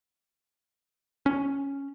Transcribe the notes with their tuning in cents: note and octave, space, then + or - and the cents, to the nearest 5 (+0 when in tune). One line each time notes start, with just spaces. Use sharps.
C#4 +0